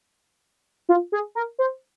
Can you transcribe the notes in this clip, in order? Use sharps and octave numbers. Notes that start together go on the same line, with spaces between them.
F4
G#4
A#4
C5